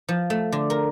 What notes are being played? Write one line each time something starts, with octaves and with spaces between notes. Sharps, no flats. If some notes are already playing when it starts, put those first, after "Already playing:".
F3
A3
D3
A#4